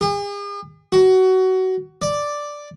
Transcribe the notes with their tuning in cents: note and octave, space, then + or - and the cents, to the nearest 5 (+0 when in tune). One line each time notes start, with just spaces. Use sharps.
G#4 -45
F#4 +20
D5 +0